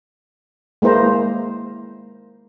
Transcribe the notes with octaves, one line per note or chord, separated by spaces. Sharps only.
G#3 A#3 E4 C5 A#5